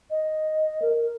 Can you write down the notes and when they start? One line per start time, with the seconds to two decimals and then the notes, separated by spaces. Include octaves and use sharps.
0.10 D#5
0.82 A#4